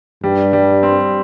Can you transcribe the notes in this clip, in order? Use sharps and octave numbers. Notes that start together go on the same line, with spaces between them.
G2 G3
G3
C4